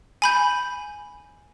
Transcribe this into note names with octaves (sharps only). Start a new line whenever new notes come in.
G#5 B5 G6